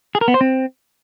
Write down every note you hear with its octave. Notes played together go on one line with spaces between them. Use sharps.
G#4
A#4
B3
C5
C4